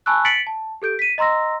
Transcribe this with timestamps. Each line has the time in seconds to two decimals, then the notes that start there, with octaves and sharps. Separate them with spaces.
0.06 G#5 A5 B5 C#6 E6 F#6
0.25 A6 B6 C#7 D7 F#7
0.47 A5
0.82 G4 A4 G6 D7
0.99 B6 D#7
1.18 D#5 A#5 C6 E6 A#6